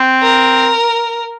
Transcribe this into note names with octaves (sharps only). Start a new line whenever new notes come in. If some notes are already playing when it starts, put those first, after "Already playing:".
Already playing: C4
A#4